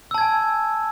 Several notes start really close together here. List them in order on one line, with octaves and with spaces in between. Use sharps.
E6 A5 G#6 G#5